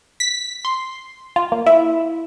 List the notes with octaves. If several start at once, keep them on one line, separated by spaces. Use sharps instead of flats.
B6
C6
F4
A#3
E4